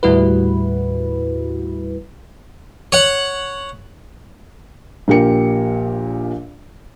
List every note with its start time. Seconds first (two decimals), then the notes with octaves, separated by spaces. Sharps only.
0.03 D#2 A2 G3 E4 F#4 B4
2.92 C#5 F#5
5.08 A#1 A#2 G4 A#4 C#7